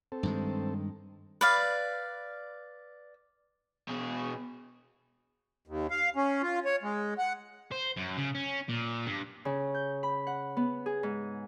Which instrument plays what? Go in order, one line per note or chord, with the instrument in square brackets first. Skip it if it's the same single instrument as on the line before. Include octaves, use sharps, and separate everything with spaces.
[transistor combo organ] C4 A4
[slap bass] G2 D#3 G#3
[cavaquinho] B4 D5 F5
[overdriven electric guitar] B2 G#4
[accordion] D#2
F5
C#4
F4
C#5
G#3
F#5
[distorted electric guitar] C5
F#2
C#3
C#4
A#2
G2
[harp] C#3
G6
B5
F#5
B3
G#4
G#2